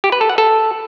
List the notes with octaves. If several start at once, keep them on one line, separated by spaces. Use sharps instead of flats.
G4
B4
A4
F#5
A4